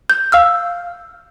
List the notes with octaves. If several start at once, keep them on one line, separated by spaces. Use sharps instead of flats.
G6
F5 E6 F6